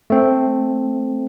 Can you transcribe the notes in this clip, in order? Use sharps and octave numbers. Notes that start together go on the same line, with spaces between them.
A3 C4